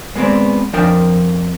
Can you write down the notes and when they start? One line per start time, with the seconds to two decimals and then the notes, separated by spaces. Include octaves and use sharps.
0.15 G#3 B3 C4 D5
0.73 F2 F3 D4 A#4 G5